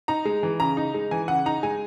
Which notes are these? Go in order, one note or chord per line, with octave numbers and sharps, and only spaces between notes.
D#4 A#5
G#3
E3
C#3 A#5
D#4
G#3
E3 G#5
C#3 F#5
D#4 A#5
G#3 G#5